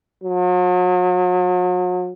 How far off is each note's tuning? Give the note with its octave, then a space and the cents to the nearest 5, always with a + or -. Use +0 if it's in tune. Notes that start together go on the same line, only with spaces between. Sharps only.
F#3 -40